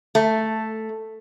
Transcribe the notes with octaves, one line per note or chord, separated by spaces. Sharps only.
A3